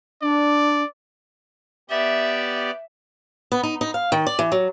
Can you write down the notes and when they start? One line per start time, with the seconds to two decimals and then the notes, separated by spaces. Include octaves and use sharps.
0.22 D4 D5
1.90 B3 G4 D5 E5
3.52 B3
3.63 D#4
3.81 D#4
3.94 F5
4.12 D#3
4.27 D5
4.39 E3
4.52 F#3